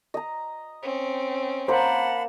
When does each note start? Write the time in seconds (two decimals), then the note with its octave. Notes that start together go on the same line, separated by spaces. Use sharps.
0.14 D#5 A#5
0.82 C4 C#4
1.68 A#3 A#4 C5 F#5 A5 B5